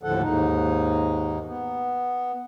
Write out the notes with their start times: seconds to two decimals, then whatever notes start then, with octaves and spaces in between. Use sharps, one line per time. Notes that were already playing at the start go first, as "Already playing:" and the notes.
0.03 D#2 A2 D3 F3 A4 F#5
0.22 D#2 G#2 D#4
1.47 B3